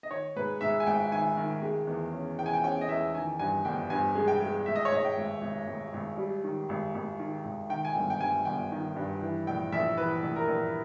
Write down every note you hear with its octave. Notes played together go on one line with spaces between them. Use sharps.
D#5
D#3 C#5
G#2 B4
G#2 E5
G#5
G#1 G5
D#3 G#5
D#3
G#3
E2
C#4
E2 G5
G#5
G5
C#4 G5
D#5
E2 E5
D#3 G#5
G2 G#5
G1 G5
G2 G#5
G#3
G5
G#3
G#1 E5
D#5
C#5
G#2 D#5
G5
G#1
G#1
G#1
G#1
G3
D#3
G#1
G#1
D#3
G#1
D#3 G5
G#5
G1 G5
G5
G2 G#5
G1 G5
D#3
G2
E3
A#1 G5
A#1 E5
E3 B4
A#1
A#4
A#1